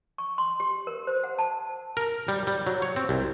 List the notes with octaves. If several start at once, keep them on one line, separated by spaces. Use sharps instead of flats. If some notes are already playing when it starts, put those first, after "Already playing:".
C#6
C6
G4
A#4
C5
F#5
A5
A#4
G3
G3
F#3
C#5
C4
C2